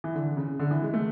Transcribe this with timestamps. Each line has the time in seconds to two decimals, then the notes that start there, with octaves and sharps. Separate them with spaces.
0.04 E3
0.15 D3
0.37 C#3
0.59 D3
0.71 E3
0.82 G#3
0.94 A3